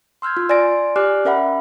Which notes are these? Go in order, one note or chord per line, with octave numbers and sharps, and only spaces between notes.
C6 E6 F6 G6 G#6
F4
D5 G#5 C6 A6 A#6 D7
G4 D5 G#5 D6 F6 F#6
C#4 A#4 E5 F#5 B5